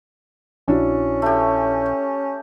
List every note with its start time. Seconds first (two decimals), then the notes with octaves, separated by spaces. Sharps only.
0.68 A#1 C#4 D4 E4 F#4
1.22 A3 G4